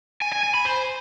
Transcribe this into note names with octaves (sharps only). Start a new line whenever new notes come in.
G#5
G#5
G#5
B5
C5